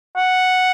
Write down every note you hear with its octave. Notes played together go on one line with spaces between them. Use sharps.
F#5